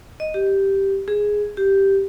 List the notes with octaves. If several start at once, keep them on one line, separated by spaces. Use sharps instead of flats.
D#5
G4
G#4
G4